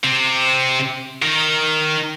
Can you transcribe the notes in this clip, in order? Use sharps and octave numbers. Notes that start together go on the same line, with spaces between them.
C3 C4
D#3 A#4